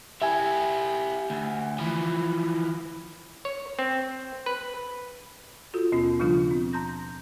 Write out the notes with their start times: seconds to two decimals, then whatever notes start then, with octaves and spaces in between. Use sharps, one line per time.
0.22 E4 G4 E5 G#5
1.30 D2
1.79 E3 F3
3.45 C#5
3.79 C4
4.46 B4
5.74 F4 F#4 A4
5.92 D#2 B2 B3 C#4 F4
6.20 C#3 F3 G3 D4 F4
6.51 C4
6.73 A5 A#5 C6 G6 A#6